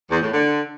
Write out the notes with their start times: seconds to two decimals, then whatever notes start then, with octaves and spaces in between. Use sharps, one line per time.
0.11 E2
0.22 A2
0.33 D3